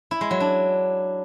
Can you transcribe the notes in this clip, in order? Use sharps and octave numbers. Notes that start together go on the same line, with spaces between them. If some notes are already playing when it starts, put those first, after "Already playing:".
E4
G#3
F#3
D4